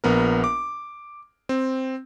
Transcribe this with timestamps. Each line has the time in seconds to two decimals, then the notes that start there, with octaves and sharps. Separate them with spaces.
0.04 A#1 B3 A#4
0.44 D6
1.49 C4